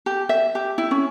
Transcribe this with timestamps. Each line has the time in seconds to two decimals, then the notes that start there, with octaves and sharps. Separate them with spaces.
0.06 G4
0.29 E5
0.55 G4
0.78 E4
0.91 C#4